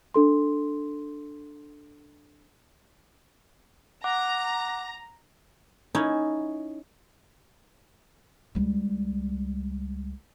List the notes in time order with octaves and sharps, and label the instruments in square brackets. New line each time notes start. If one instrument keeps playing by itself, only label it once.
[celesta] D4 A4 C6
[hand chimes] F#5 D6 F#6 [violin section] A#5
[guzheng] C#4 D#4 E4
[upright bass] C#2 G3